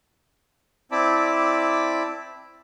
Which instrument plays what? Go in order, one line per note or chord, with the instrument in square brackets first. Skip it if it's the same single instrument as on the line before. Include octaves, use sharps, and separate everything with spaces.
[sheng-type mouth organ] C4 E4 D5 A5 B5 D6